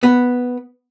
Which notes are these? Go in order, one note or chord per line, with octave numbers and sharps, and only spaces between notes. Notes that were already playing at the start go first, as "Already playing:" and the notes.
B3